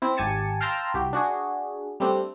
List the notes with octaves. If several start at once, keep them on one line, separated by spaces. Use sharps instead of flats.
C4 E4
G#1 G4 G#5 A5 C#7
F5 G5 A5 A#5 C6 E6
C2 F#4 G4
D4 F#4 G#4
G3 A3 C4 D4